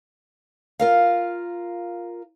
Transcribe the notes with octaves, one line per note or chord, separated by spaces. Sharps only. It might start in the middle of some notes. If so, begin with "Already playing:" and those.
F4 A#4 F5